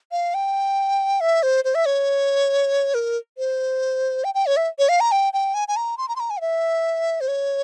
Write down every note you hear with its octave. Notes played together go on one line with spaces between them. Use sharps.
F5
G5
E5
C5
C5
E5
C#5
A#4
C5
G5
G5
C#5
E5
C#5
F5
A#5
G5
G5
G#5
G#5
A#5
C6
A#5
C6
A#5
G#5
F5
E5
C5
C#5